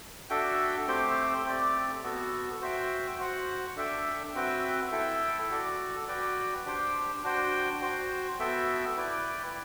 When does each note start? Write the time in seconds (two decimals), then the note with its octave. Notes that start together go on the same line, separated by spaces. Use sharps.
0.30 D4 F#4 A4 E5 G5
0.88 A3 C4 G4 C5 G5
1.45 A3 C4 G4 D5
2.03 B3 F#4 A4
2.61 F#4 C5 E5 G5
3.19 F#4 C5 F#5
3.76 D4 A4 E5 G5
4.34 C4 F#4 B4 E5 G5
4.92 E4 A4 E5 G5
5.50 F#4 A4 D5
6.08 F#4 B4 D5 G5
6.65 D4 G4 C5 G5
7.24 D4 F#4 C5 G5
7.81 F#4 C5 G5
8.39 B3 F#4 A4 E5 G5
8.97 E4 B4 D5 G5